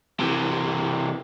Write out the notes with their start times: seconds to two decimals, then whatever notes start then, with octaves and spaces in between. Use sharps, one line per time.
0.19 C3 E3